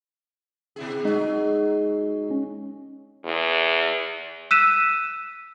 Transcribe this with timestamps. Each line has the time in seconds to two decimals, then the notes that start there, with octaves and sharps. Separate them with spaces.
0.76 B2 E4 G#4
1.04 F#3 G#3 D#4 G#4 D#5
2.31 C#4
3.24 E2
4.51 E6 F#6 B6 D#7 E7